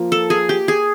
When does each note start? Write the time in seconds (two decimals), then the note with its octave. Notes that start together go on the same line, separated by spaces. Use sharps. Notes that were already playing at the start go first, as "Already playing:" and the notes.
Already playing: F3 A#3
0.12 A4
0.30 G#4
0.49 G4
0.68 G#4